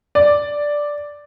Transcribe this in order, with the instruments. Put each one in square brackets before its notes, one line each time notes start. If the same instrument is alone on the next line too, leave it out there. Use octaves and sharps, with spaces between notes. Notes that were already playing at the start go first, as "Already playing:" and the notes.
[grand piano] D5